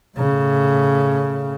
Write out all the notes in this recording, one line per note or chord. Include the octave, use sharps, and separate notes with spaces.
A2 C#3